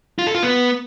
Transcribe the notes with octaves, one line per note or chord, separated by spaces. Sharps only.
F4
A4
F4
B3